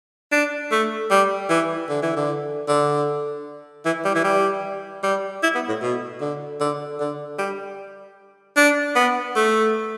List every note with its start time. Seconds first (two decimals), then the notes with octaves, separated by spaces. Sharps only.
0.31 D4
0.71 A3
1.10 G3
1.49 E3
1.89 D3
2.02 E3
2.16 D3
2.68 D3
3.85 E3
4.04 G3
4.15 E3
4.24 G3
5.03 G3
5.43 E4
5.55 B3
5.68 A2
5.82 B2
6.21 D3
6.60 D3
7.00 D3
7.38 G3
8.56 D4
8.95 B3
9.35 A3